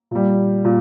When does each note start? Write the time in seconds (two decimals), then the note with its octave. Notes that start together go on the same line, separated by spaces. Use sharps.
0.11 A#2 G3
0.65 A#2